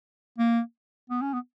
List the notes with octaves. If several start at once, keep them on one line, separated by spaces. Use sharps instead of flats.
A#3
B3
C#4
B3